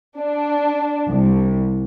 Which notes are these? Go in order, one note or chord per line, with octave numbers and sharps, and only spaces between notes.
D4
C2